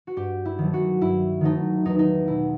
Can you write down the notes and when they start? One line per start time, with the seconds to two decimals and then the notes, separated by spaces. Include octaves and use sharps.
0.07 F#4
0.17 G2 G4
0.45 E4
0.58 D#3 F#3 A3
0.74 F#4
1.01 G2 E4
1.41 D#3 F#3 A3 D#4
1.85 E2 D#4
1.99 D#4
2.27 B2 A3 E4